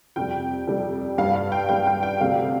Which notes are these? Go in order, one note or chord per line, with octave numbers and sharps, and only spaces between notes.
F2 C3 G3 G5
F2 C3 G3
G2 G3 F5
F5
G5
G2 G3 G5
G5
G5
D2 C3 G3 F5